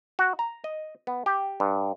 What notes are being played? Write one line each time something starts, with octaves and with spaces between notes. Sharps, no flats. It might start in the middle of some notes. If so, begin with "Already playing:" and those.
F#4
A#5
D#5
B3
G4
G2